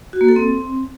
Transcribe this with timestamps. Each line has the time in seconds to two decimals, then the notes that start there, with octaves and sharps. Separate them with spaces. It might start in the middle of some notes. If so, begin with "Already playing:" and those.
0.13 F#4
0.21 A#3
0.28 A4
0.36 C4